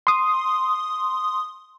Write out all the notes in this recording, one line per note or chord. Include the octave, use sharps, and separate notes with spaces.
C6 D#6